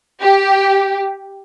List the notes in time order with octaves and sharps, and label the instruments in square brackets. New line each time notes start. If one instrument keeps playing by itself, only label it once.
[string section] G4